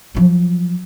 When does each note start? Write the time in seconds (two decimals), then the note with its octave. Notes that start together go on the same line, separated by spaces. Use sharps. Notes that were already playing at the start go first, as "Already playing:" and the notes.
0.15 F3 F#3